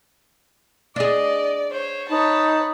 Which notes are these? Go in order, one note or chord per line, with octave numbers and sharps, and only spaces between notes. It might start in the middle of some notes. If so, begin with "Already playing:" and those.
D4 G#4 D5 D#5
C5 C#5
D#4 B4 C#5 A5